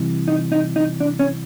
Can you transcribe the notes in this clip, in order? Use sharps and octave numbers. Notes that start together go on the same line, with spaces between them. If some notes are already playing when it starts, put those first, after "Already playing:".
Already playing: C3 E3 G3
D#4
D#4
D#4
D4
C#4